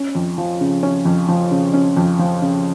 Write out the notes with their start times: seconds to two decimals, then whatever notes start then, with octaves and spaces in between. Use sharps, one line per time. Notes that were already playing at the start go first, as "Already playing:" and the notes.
Already playing: C#4
0.15 F2
0.38 F3
0.61 C#3
0.83 C#4
1.05 F2
1.29 F3
1.51 C#3
1.74 C#4
1.97 F2
2.19 F3
2.42 C#3